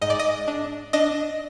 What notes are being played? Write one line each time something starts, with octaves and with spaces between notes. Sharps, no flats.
G#2 D#5
D5
D#5
D4
D4 D#5